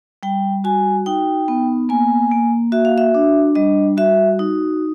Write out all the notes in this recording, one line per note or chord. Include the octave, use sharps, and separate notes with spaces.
G3 G5
F#4 G#5
D#4 G5
B3
A#3 G#5
A#3
F#4 E5
F5
E5
D4
G3 D#5
F#4 E5
D#4